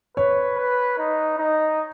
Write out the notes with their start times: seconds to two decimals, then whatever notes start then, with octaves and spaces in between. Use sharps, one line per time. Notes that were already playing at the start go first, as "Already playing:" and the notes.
0.16 B4 C#5
0.58 B4
0.98 D#4
1.38 D#4